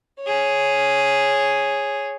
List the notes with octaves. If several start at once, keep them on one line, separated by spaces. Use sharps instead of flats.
G#4 C#5